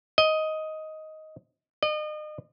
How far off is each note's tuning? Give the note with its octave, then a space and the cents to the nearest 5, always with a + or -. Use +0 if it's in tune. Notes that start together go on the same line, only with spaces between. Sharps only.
D#5 +10
D#5 -35